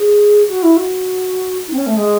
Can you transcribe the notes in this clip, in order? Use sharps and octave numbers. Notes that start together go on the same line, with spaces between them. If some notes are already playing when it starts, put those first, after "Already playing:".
Already playing: G#4
F#4
E4
F#4
D#4
C4
C#4
A3
G#3